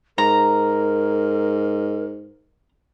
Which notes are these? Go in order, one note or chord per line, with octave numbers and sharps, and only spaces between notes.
G#2 A#4 A#5